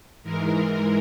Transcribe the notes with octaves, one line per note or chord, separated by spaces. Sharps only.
G#2 E3 G#3 A#4